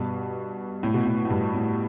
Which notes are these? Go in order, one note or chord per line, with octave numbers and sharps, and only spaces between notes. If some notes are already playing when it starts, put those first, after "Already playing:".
Already playing: G2 B2
A2
B2
A2
A2
G2
A2